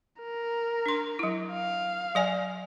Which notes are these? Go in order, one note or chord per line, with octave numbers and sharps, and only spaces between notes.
A#4
D4 C6
F#3 E4
F5
F#3 D5 G#5